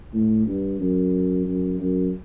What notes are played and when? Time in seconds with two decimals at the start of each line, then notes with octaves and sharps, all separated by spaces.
0.13 A2
0.46 G2
0.80 F#2
1.46 F#2
1.80 F#2